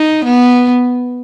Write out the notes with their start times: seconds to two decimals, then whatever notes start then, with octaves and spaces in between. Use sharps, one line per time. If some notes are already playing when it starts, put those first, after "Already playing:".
Already playing: D#4
0.24 B3